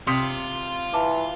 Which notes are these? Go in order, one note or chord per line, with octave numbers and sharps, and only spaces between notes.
C3 F4 C6 D#6 B6
E3 A5 D6